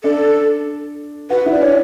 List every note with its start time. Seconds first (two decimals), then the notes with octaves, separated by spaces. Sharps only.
0.04 D4 A4
1.30 F#4 B4
1.46 E4
1.52 D5
1.62 D4 C#5